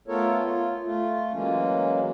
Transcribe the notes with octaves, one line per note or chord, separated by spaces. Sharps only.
A3 B3 F4 A4 A#4 C#5
F4
A3 F4
E3 F#3 G#3 A#3 C#4